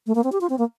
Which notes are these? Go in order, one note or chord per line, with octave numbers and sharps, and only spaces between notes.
A3
A#3
C4
G4
F4
C4
A#3